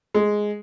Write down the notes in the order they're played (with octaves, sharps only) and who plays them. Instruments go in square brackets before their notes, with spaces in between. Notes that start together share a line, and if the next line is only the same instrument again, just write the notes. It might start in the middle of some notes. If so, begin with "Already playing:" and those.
[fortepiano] G#3